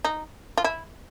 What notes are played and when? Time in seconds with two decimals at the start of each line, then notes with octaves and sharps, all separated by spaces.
0.05 D#4
0.58 F4
0.64 E4